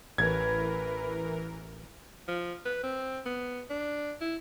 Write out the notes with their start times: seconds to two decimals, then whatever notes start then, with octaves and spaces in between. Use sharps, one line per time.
0.18 A1 E3 A#4 B4 G#6
2.28 F3
2.65 B4
2.83 C4
3.25 B3
3.69 D4
4.21 E4